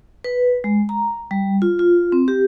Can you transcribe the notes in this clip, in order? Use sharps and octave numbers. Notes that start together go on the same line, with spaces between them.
B4
G#3
A#5
G3
F4
F4
C4
G4